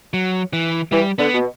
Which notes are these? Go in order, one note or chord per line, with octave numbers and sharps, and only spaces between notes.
F#3
E3
E3 G3
D3 B3
B2